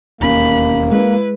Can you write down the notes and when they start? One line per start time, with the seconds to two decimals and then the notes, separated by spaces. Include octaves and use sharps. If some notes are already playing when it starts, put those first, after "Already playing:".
0.21 E1 D#2 A#3 C#4 B5
0.92 G#3 E4 B4